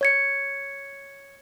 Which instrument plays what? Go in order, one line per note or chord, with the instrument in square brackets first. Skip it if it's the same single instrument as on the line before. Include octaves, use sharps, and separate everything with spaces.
[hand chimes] C#5 G#6 C#7